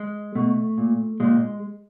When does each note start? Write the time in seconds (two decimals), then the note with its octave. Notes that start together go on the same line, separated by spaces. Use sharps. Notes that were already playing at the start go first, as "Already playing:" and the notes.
Already playing: G#3
0.35 B2 A3
0.78 A#2
1.20 A#2 G#3